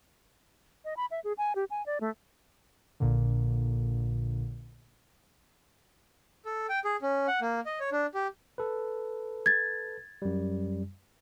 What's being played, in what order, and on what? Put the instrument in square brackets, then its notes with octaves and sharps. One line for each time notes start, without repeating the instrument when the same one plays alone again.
[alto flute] D#5
B5
E5
G#4
G#5
G4
G#5
D5
A3
[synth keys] A#1 A#2 D3
[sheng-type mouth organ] A4
G5
G#4
C#4
F#5
A#3
D#5
C#5
D4
G4
[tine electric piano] A4 B4
[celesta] G#6 A6
[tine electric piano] F#2 G3